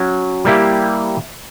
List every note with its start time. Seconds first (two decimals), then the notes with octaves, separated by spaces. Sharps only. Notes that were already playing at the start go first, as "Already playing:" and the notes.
Already playing: F#3 C#4 F#4
0.45 G3 A#3 E4 G4